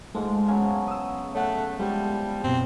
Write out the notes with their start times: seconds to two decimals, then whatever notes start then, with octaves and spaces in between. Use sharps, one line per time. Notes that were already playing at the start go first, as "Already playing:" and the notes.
0.15 G#2 F3 G#3 A3
0.48 C#3 F#3 B3 F5 G#5
0.88 D#6 E6
1.35 A3 C#5 F#5 F#6
1.79 F3 G3 G#3 B3 E4
2.44 F#2 B2 C4